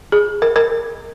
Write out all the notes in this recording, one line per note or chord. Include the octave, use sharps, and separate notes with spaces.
G#4
A#4
A#4